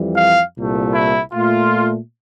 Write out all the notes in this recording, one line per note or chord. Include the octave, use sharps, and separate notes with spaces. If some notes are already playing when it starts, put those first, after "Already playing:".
Already playing: F2 E3 G3
F5
C2 A#2 A3
E4
A#2 A3 F4